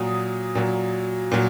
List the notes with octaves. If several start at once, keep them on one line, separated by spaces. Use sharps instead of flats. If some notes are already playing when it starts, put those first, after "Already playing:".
Already playing: A#2 F#3 D#6
A#2 F#3
A#2 F#3